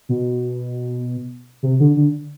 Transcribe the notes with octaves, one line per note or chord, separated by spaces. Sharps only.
B2
C3
D3
D3